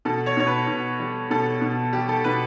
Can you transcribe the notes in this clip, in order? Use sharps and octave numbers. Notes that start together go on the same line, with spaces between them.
B2 A4
C#5
B2 C#5
B4
B2
G3
B2 A4
B2
G3 G4
A4
B2 B4